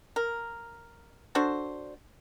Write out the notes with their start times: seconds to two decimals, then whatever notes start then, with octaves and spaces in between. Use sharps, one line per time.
0.16 A#4
1.35 D4 F#4 A4 C5